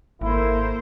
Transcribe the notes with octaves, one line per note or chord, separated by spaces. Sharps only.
G#1 A#3 E4 A4 A#4 C5